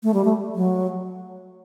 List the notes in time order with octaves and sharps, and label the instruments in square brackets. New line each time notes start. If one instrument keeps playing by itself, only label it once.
[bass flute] A3
G3
A3
F#3